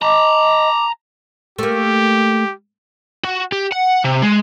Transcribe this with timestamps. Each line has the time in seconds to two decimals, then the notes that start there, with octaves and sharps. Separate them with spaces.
0.02 D#5 A5 A#5 D6
1.59 A3 A#3 G4
3.24 F#4
3.52 G4
3.72 F#5
4.05 C3
4.23 G#3